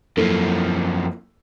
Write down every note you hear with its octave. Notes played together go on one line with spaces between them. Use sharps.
F#2 F3 A#3 E4 A4